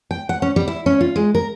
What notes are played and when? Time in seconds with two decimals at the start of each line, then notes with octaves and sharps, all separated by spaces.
0.11 G5
0.29 F#5
0.42 C#4
0.56 G3
0.68 E4
0.86 C#4
1.01 F4
1.16 G#3
1.35 A#4